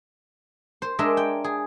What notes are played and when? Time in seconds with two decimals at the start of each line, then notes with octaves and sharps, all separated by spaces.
0.82 C5
0.99 G#3 D4 A#4 D#5 E5
1.17 G5
1.44 G#4